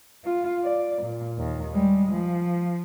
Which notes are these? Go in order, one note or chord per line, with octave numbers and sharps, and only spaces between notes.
F4
D5
A#2
D#2
G3 G#3
F3